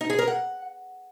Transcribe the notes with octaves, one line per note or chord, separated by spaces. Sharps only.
D#4
G#4
A#4
F#5